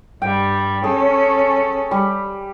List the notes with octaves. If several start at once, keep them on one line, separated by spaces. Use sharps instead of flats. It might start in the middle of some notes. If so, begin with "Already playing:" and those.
G2 G3 G5
C#4 G#4 A4
G3